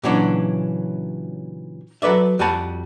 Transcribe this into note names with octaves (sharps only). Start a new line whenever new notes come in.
A#2 C#3 E3 F#3 C#4 D4
F#3 A4 B4 D5 E5
F2 G3 F#4 G#5 A5 B5